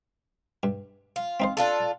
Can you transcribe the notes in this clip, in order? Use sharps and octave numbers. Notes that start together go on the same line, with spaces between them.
G2
F4
C4 D#4 C5
D4 F4 A4